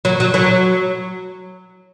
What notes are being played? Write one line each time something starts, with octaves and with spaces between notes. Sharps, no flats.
F#3
F#3
F#3